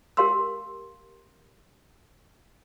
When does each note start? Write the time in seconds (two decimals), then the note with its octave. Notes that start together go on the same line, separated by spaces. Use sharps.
0.17 G4 A#4 F5 C6 E6